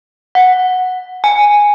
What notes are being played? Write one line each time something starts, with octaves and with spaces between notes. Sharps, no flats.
F#5
G#5